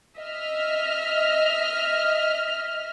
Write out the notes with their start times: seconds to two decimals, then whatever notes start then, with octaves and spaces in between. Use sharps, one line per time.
0.18 D#5 E5 F6